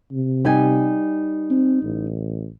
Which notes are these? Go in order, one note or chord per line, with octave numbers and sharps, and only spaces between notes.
C3
G3 D#4 G#5
C4
A1